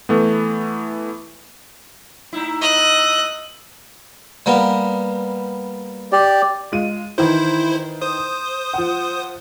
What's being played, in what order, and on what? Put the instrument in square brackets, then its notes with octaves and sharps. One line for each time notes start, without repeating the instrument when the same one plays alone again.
[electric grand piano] E3 A3 B3
[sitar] A2 D#4 E4
[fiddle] D#5 F#6
[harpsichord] G3 A#3 B3
[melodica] G4 D5
[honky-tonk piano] G#3 F4 D#7
[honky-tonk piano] D#3 E3 [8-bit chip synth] E4 C5
[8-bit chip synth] C5 D#6
[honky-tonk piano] F3 F#5